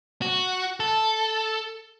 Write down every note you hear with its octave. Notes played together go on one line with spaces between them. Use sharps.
F#4
A4